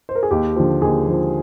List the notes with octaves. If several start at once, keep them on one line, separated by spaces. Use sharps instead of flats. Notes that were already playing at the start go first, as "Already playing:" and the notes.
C5
A#4
G#4
D#2 G4
D3 F3
D#2 G#4
D3 F3